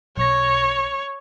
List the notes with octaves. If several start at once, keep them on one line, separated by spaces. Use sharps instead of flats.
B1 C#5 A#6